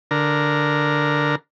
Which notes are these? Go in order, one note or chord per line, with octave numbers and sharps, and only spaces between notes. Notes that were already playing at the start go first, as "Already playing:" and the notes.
D3 A#4